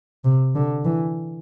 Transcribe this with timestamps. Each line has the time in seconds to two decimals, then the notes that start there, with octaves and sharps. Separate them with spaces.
0.25 C3
0.55 D3
0.85 E3